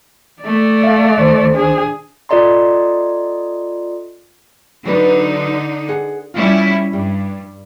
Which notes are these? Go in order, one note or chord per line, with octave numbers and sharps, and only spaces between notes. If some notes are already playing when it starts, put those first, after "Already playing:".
A3 D5
E5 F5
C#2 D#3 C5
D4 G#4
F4 A4 D5 D#5 A#5 C6
D3 F#3 D#4 B4
G#4 F#5
G3 C#4 E4 F4
G2 G3